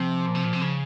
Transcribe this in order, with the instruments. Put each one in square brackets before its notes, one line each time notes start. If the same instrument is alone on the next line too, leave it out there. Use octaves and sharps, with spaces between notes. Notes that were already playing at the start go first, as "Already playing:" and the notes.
Already playing: [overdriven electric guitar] C3 [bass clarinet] F3
[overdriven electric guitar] A#2
C3
A#2
C3
C#3